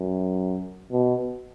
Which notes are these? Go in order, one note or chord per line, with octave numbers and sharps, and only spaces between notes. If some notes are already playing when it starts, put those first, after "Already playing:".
Already playing: F#2
B2